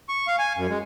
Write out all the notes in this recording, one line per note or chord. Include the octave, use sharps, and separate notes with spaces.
C#6
F5
G#5
F#2
G#3